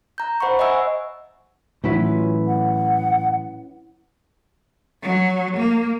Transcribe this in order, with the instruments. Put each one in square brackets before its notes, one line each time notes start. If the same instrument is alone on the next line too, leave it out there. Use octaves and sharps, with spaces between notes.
[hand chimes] A#5 G6
C5 F#5 B5 C#6
D#5 E5 F#5 G#5 E6
[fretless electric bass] A2 E3 F#3 [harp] C#4 E4 B4 [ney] F4
[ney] F#5
[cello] F#3
A#3